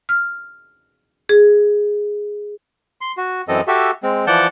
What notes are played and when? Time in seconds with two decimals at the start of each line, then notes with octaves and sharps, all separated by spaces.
0.09 F6
1.29 G#4
3.01 C6
3.17 F#4
3.48 F#2 E3 C4 A4 D#5
3.67 F#4 G4 A4 E5
4.03 G#3 C4
4.27 E3 F3 D5 F#5 A5 G6